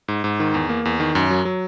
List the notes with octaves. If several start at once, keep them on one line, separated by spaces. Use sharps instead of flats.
G#2
G#2
D#3
E2
A#3
E2
D#3
F#2
F#3
F#3